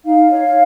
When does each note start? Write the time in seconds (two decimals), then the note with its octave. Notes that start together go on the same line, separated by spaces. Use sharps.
0.04 D#4 F5
0.30 C#5